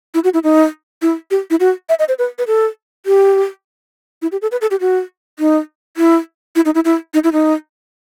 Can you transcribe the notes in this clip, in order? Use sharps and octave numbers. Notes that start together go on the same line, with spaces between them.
E4
F#4
E4
D#4
E4
G4
E4
F#4
E5
D#5
C5
B4
B4
A4
G4
E4
G4
A4
B4
A4
G4
F#4
D#4
E4
E4
D#4
E4
E4
D#4
E4
D#4